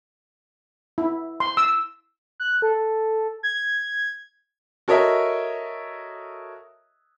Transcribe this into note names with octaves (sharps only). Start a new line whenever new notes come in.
E4
C6
E6
F#6
A4
G#6
F#4 A4 A#4 C#5 D#5 E5